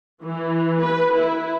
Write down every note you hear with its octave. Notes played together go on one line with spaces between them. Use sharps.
E3
B4
E4